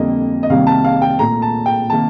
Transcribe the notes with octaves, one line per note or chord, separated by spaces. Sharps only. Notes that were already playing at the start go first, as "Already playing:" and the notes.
Already playing: F2 D3 G3 A#3 D#5
D#5
C2 C3 D#3 G3 A#3 F5
A5
F5
G5
A#2 A3 A#5
A5
G5
C3 D#3 A#3 A5